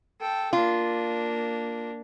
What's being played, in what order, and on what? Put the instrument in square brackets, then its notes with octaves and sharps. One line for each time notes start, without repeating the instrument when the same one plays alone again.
[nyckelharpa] A4 G5
[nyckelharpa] A#3 D4 [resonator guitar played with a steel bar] F4